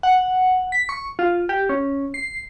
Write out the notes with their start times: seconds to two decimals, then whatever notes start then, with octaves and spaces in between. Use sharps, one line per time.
0.03 F#5
0.72 B6
0.89 C#6
1.19 F4
1.49 G4
1.69 C#4
2.14 C7